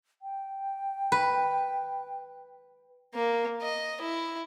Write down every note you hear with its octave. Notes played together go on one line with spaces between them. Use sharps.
G5
B4
A#3
D#5
E4